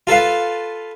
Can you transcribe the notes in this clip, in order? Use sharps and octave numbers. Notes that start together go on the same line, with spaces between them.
F4 A4 B4 F5